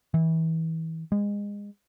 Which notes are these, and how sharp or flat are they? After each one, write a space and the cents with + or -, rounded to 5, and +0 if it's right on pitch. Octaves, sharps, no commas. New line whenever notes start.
E3 -30
G#3 -25